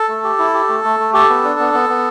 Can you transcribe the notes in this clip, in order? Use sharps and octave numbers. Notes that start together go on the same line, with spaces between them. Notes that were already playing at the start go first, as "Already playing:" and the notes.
Already playing: A4
A3
G4
E4
G4
A3
A3
A3
G4 A4
B3
D4
B3
B3
B3